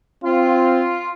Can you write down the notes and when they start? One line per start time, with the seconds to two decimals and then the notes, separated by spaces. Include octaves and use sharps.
0.24 C4 F4